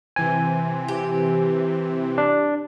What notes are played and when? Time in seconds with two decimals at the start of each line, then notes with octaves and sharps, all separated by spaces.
0.16 C3 E3 C4 G#5
0.88 G4
2.18 D4